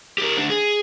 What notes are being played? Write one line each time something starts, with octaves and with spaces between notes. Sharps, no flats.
G4 A#4
D2 D4
G#4